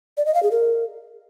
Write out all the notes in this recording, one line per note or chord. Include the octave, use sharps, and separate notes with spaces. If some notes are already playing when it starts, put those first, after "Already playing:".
D5
D#5
F5
G#4
A#4